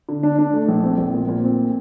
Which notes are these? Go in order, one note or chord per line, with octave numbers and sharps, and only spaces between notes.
D3
D4
D4
A3
A#1
C4
A#1
A#2
A#2
C4